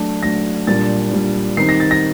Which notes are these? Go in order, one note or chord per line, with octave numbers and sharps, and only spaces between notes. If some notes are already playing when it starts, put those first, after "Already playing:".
Already playing: F#3 A3 D4
F#3 A3 D4 A#6
A#2 G3 D4 A6
A#2 G3 D4
D#3 G3 C4 D#4 C7
A#6
A6
A#6